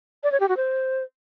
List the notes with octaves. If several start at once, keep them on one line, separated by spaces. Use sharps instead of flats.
D5
C#5
G4
F#4
C5